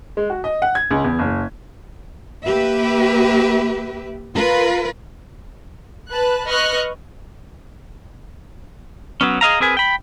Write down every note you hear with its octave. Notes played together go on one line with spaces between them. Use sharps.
G#3
F#4
D#5
F#5
G#6
C#2
E2
F#1
A#3 G4 B4 E5
F4 A#4 B4
B4 A5 F#6
B4 D#5 C#6 F6 F#6
F#3 B3 C#4
G#4 D#5 F5 A#5
C4 G#4 A#4 B4 G#5
G5 B5